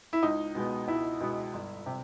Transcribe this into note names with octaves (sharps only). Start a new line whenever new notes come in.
E4
C#2 D#4
B2 G#3 B3
C#2 E4
B2 G#3 B3
G1
C3